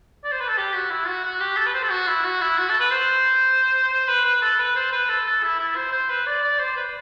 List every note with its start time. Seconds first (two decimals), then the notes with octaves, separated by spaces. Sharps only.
0.24 D5
0.32 C5
0.41 B4
0.48 A4
0.58 G4
0.74 F#4
0.91 E4
1.08 F#4
1.25 F#4
1.40 G4
1.57 A4
1.66 B4
1.74 C5
1.83 A4
1.90 F#4
2.08 E4
2.24 F#4
2.42 E4
2.58 F#4
2.70 A4
2.80 B4
2.91 C5
3.92 C5
4.08 B4
4.25 B4
4.42 A4
4.59 B4
4.76 C5
4.92 B4
5.09 A4
5.26 A4
5.43 E4
5.59 E4
5.76 C5
5.92 C5
6.10 B4
6.27 D5
6.43 D5
6.59 C5
6.77 B4